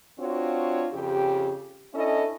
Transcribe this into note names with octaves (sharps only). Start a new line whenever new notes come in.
C4 D4 F4 F#4 C#5
F2 C#3 G4
C#4 D4 E4 A4 D#5